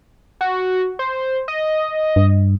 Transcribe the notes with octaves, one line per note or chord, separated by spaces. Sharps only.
F#4
C5
D#5
G2